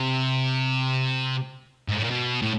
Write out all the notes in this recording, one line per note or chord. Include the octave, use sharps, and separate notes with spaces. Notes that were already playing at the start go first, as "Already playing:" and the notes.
Already playing: C3
G#2
A2
A#2
B2
A2